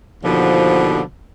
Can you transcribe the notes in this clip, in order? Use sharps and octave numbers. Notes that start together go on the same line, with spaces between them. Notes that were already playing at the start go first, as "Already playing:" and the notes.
D#2 B2 D3 F3